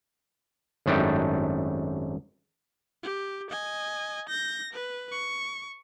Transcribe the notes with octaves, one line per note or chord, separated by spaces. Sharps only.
G#1 F#2 A3 D4 D#4 G4
G4
D#5 G#5
G6 A#6
B4
C#6